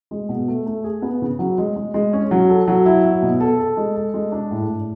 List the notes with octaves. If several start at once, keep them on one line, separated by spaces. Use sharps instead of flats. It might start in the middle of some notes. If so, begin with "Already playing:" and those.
G#3
B2
A3
A3
G#4
B3
C#3
F#3
G#3
G#3
G#3
C#4
F#3
A4
F#3
E4
F#3
B2
A4
A4
G#3
A4
G#3
D4
A2
A2